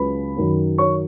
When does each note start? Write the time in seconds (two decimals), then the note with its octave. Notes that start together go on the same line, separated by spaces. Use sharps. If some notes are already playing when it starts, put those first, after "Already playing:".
Already playing: C#2 C#3 F#3 B4 B5
0.36 F#2 D#3 F#3
0.78 C#5 C#6